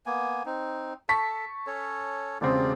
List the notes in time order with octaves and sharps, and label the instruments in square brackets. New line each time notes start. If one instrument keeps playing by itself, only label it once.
[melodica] A#3 B3 G#5
C4 D#4
[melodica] A4 [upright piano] A5 C#6 B6
[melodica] C#4 A4 C#5
[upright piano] E1 C#3 C4 [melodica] F4 G4 D5